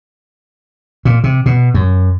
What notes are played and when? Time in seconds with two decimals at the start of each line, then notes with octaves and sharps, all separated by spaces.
1.05 A#2
1.24 C3
1.46 B2
1.74 F#2